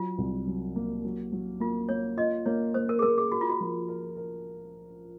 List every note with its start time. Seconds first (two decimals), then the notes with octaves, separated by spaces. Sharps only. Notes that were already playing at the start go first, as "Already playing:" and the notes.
Already playing: F#3 F4
0.18 C2
0.47 F#3
0.76 A#3
1.04 F#3
1.32 F#3
1.60 A#3 F4
1.89 A#3 C#5
2.17 F4 D#5
2.46 A#3 C#5
2.74 A#3 C5
2.89 A#4
2.99 G#4
3.02 A#3 A#4
3.18 G#4
3.32 F#4 A#4
3.41 F4
3.49 F#4
3.60 F3
3.88 A#4
4.17 A#4